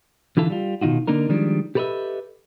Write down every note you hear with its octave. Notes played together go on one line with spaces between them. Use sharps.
D3 E3 E4 F4 A4
G3 F4
B2 D#3 D#4 F4 F#4
D3 A#3 D4 D#4 A#4
D#3 F3 G3 G#3 D4
G4 A4 B4 C#5 D#5 E5